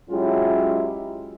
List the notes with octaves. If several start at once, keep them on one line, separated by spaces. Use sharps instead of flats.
F#3 G#3 C#4 E4 F4 G4